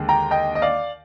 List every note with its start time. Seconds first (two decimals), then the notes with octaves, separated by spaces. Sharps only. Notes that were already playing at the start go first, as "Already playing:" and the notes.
Already playing: D#2 D3 G#3
0.09 G5 A#5
0.31 D#5 G5
0.55 D#5
0.62 D5 F5